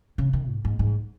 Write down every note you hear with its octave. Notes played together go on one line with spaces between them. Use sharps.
C#3
D#3
G#2
G#2
G#2